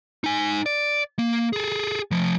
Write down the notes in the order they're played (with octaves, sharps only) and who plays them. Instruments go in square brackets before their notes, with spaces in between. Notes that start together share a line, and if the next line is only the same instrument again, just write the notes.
[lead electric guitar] D#4 G#5
D5
A#3
G#4 A4
F3 A3